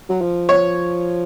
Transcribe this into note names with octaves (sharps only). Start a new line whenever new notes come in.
F#3
F3
C#5